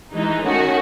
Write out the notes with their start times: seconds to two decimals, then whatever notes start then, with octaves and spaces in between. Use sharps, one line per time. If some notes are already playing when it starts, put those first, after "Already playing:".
0.14 E3 G#3 D#4
0.44 D#3 A3 C#4 F#4